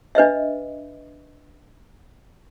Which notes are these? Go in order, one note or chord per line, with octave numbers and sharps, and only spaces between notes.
D4 B4 D#5 E5